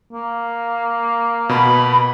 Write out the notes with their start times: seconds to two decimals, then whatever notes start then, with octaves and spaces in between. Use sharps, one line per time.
0.12 A#3
1.49 B2 B5